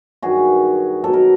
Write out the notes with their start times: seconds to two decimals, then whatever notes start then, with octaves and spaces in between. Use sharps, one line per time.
0.22 G2 D#3 F#3 F#4 G#4
1.04 B2 F#3 A4
1.13 A#4